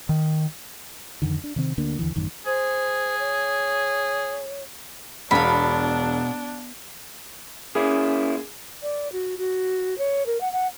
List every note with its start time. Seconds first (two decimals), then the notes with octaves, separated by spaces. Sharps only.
0.09 D#3
1.22 F2 D3 D#3
1.44 D4
1.56 C3 D#3 C4
1.78 D2 D3 A#3 D4
1.99 D#2 D3 E3
2.16 A1 F#2 D#3
2.46 G#4 C5
3.19 C#5
5.31 E1 B2 D4 F5 B5
7.75 A#3 C#4 E4 G#4
8.82 D5
9.12 F#4
9.38 F#4
9.98 C#5
10.26 A#4
10.41 F#5
10.52 F#5